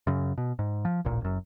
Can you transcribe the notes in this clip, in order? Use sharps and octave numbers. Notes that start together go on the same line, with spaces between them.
F#2 C#3
B2
G#2
F3
D1 A1 A#2
F#1 F#2